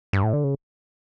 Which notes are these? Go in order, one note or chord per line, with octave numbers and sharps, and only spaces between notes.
G2
A2
D3
C#3